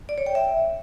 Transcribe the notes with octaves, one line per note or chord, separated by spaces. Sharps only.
D5
C#5
G5
E5